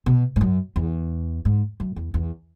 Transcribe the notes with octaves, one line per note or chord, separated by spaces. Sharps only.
B2
G#2
F#2
E2
G#2
F#2
E2
E2